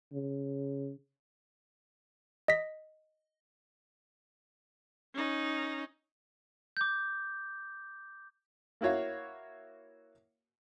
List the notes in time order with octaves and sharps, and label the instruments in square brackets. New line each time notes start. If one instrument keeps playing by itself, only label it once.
[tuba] C#3
[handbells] D#5 B6
[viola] C#4 D#4
[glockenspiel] D6 G6
[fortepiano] A#3 E4 F#4 C#5 F5